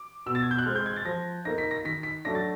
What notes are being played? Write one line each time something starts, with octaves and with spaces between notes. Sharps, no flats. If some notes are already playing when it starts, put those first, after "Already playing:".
Already playing: D6
B2 E6
A6
G#6
G6
F#6
G#3 C4 F6
G6
G#6
A6
F3 A#6
A#3 D#4 A#6
B6
A#6
D#3 B6
B6
F#3 A3 D4 A#6
A6